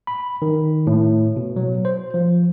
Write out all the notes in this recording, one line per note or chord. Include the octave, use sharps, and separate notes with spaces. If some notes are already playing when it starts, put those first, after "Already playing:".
B5
D#3
A2
B2
F#3
C5
F3